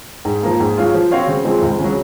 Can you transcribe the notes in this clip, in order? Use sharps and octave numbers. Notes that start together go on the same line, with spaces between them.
G#2
F3 A#3
G#2
F#3 C#4 F4 G#4
F3
C4 F#4 C#5 F5
C#3
F3 G#3 C4
C#2
C#3
F#3